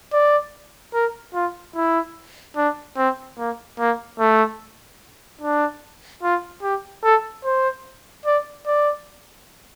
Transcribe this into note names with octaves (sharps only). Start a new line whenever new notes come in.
D5
A#4
F4
E4
D4
C4
A#3
A#3
A3
D4
F4
G4
A4
C5
D5
D5